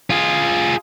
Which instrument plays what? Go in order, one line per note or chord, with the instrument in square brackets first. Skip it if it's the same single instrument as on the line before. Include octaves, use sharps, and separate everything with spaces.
[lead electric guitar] F4 G#4